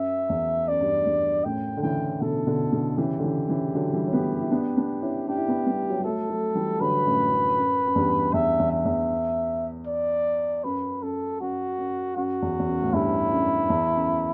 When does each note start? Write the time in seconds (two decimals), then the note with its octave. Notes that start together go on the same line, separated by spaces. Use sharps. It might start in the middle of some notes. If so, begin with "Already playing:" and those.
Already playing: F#2 E5
0.29 E2
0.68 F#2 D5
0.81 G2
0.93 F#2
1.06 E2 G2
1.45 F#2 A2 G5
1.77 D3
1.82 C#3 E3 G5
2.21 B2 D3 A4
2.47 B2 D3
2.72 B2 D3
2.97 C#3 E3 G4
3.19 D3
3.23 C#3 E3
3.49 C#3 E3
3.75 D3 F#3
3.93 E3 G3
4.07 C#4
4.13 G3 B3
4.41 E4
4.51 B3 D4
4.77 B3 D4
5.02 C#4 E4
5.28 D4 G4
5.38 E4
5.48 B3 D4
5.66 G3 B3
5.90 F#3
5.97 G3
6.04 F#3 A3 A4
6.29 F#3 A3
6.55 E3 G3
6.81 D3 F#3 B4
7.06 F#2 A2
7.31 F#2
7.57 F#2
7.87 F#2
7.95 E2 G2
8.34 E2 E5
8.59 E2
8.72 E5
8.85 E2
9.87 D5
10.64 F#2 B4
11.02 F#2 A4
11.40 F#2 F#4
11.78 F#2
12.16 F#2 F#4
12.42 E2
12.59 E2
12.68 F#2
12.82 A2
12.93 E2 G2 E4
13.32 F#2
13.70 E2
13.95 F#2